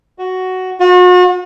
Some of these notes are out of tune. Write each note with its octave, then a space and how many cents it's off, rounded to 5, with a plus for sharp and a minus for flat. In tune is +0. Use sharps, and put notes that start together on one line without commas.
F#4 +5
F#4 -40